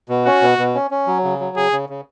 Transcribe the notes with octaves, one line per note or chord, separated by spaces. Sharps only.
B2
C#4 F#4
B2
B2
C#4
C#4
F#3
C#3
F#3
C#3 G#4
C#3
C#3